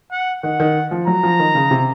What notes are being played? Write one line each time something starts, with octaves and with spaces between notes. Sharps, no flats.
F#5
D#3 F#5
D#3
F3
F#3 A#5
F3
D#3
C#3
C3